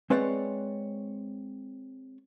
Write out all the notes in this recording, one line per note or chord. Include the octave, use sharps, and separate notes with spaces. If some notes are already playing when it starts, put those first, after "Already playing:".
G#3 C4 B4 C#5 D5 F#5